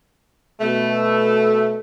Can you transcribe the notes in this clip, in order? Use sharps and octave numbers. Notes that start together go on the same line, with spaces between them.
B2 A3